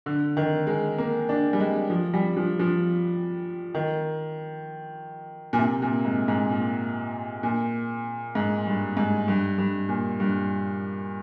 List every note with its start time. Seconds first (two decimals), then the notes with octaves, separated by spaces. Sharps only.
0.06 D3
0.37 D#3
0.67 G#3
0.98 A#3
1.29 D4
1.53 G3
1.60 G#3
1.90 F3
2.13 G3
2.37 F3
2.60 F3
3.75 D#3
5.53 A#2
5.59 C3
5.82 A#2
6.05 G#2
6.28 G#2
6.50 A#2
7.43 A#2
8.35 G#2
8.67 G2
8.97 G#2
9.28 G2
9.58 G2
9.89 A#2
10.20 G2